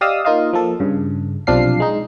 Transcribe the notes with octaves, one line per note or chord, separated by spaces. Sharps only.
G4 D5 D#5 F5 D#6 E6
A#3 D#4 F4 D#5 F5
F3 A#3 A4
G2 C#3
B1 C3 F3 D4 F5 C7
G#3 D#4